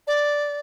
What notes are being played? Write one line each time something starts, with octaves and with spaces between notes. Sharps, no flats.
D5